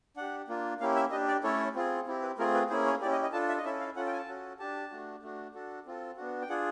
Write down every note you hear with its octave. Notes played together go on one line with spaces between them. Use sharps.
D4 G4 F#5
A#3 D4 F4
A#3 C#4 E4 G4 F5
E5
D4 G4 D#5
D5
A3 C#4 E4 A4 C#5
C4 F4 G#4
C4 E4 G4
B4
A3 C4 F4 G#4 A#4
B4
A#3 C#4 E4 G#4 C5
C#5
C#4 E4 G4 D5
D#5
D#5
D4 F4 A4 A5
E5
D#5
C#4 E4 A4 E5
F5
C#4 F4 A4 F#5
G5
G#5
A5
C#4 F#4 A4
D4 G4 A5
A3 D4 F#4
A3 D4 F#4
D4 F#4 A4
C4 F4 A4
B3 D4 F#4
G5
D4 F4 G#4 F#5